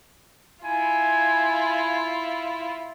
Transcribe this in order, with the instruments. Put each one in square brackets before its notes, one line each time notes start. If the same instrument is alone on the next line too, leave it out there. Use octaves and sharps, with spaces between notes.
[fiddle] E4 F4 [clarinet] G#5